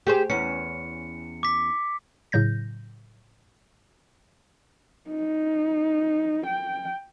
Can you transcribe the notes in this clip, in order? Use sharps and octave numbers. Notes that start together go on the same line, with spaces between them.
G4 G#4 C5
E2 C#4 C#7
D6 B6
A2 C#3 F#3 G6 A#6
D#4
G5